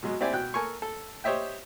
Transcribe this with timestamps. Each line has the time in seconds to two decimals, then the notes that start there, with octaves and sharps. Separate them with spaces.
0.03 B2 F#3 G#3
0.21 C4 E4 G4 D5 G5 G#5
0.33 B2 G5 F#6
0.54 A4 A#4 G#5 C#6
0.82 A4
1.24 G4 C5 C#5 D#5 E5 G5